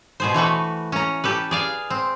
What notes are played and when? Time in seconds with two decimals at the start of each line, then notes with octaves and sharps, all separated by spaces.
0.20 B2 G#4 C5
0.34 E3 A3 F#4 B4
0.92 C#4 A#5
1.24 G4 A4 B4
1.51 G#4 D5 F5
1.90 C4